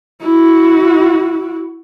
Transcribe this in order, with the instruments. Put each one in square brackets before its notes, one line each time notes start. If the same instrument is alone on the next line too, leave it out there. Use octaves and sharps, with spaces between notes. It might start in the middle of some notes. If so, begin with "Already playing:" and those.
[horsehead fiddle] E4 F#4